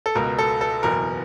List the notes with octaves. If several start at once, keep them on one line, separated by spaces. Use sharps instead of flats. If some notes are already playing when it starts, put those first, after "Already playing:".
A4
C#2 B2 A#4
A4
A4
F#1 E2 B2 A#4